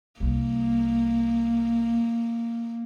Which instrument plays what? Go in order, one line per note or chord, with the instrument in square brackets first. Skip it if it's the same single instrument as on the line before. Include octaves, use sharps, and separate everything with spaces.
[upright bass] C2 G3 [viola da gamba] A#3